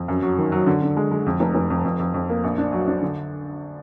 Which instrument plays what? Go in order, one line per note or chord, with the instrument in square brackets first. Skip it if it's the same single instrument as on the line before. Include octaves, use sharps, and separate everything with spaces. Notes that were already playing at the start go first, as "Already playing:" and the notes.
Already playing: [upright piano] F2
F#2
F#3
D#3
F#3
D3
D3
G#3
G#3
F2
F1
F1
F2
F2
F2
F2
A#3
A#1
D4
F#3
D4
D3